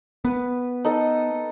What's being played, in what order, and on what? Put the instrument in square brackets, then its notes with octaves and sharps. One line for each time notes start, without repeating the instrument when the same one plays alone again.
[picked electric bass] B3 [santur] B4
[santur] D#4 A4 D#5